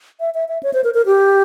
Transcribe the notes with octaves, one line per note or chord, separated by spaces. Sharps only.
E5
E5
E5
C#5
C5
A#4
A#4
G4